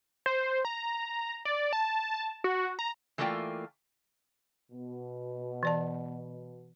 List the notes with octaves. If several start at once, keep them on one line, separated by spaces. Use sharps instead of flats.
C5
A#5
D5
A5
F#4
A#5
E3 A3 A#3 F4 D5 G5
B2
E3 D5 A5